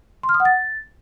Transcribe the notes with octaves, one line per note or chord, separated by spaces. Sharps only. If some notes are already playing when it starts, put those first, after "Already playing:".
C6
F6
D#6
F#5
A6